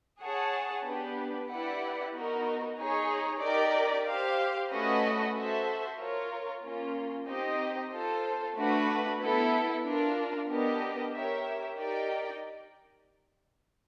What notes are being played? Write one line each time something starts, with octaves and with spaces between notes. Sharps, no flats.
G#4 C#5 F#5 A5
B3 D4 G4 B4
E4 G4 B4 D5 F#5
B3 D#4 F#4 A#4
D#4 G#4 C#5
D#4 G4 A#4 D5
G4 C5 F5
A3 C#4 F#4 B4 D#5
F#4 A4 C5 E5
F4 A#4 C#5
A#3 C#4 F4
C4 D#4 G4 C5 D#5
F4 A4 C5
A3 D4 F#4 B4
B3 E4 A4
D4 F4 A#4
B3 D4 G4 A#4 D#5
G4 A#4 C#5 E5
D#4 G4 A#4 D5 G5